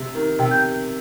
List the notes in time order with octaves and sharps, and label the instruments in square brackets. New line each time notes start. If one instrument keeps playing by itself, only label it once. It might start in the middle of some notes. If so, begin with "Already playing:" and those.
Already playing: [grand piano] C3
D#3
[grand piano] C3 [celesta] G5
[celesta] G6